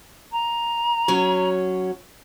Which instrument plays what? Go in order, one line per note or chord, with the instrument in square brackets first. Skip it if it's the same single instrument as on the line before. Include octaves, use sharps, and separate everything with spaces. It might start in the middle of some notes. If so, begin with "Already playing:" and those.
[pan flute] A#5
[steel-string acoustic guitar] F#3 C#4 C#5